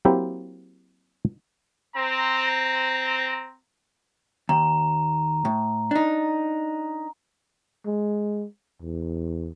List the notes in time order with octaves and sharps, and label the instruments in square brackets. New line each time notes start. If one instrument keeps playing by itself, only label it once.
[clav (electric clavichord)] F#3 A#3 C4 E4 G4
[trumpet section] C4 A#5
[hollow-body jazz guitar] D#2 [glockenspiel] A#5
[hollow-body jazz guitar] A2
D4 D#4
[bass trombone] G#3
E2